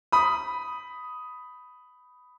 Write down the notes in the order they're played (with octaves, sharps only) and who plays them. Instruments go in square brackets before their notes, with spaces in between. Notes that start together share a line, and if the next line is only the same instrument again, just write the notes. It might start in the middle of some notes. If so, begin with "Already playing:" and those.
[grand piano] B5 D#6